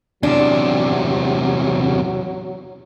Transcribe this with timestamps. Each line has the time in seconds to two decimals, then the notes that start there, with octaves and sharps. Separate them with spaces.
0.23 E2 C3 F#3 D4